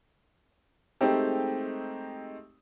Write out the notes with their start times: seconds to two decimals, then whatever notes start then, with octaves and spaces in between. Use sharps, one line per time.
1.01 G#3 A3 C4 D#4 G4